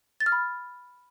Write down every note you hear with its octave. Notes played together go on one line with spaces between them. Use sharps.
A6
F6
B5